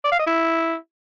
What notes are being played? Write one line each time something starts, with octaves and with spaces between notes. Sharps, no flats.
D5
F5
D#5
E4